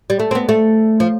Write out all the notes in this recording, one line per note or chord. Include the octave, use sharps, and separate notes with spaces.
G3
A3
C4
B3
A3
F3